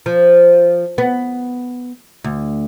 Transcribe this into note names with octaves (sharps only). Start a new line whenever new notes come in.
F3
B3
D2